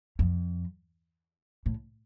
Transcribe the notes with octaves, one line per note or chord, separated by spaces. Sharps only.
F2
A2